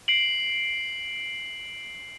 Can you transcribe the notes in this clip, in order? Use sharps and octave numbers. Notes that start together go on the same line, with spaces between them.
C7 D7 F#7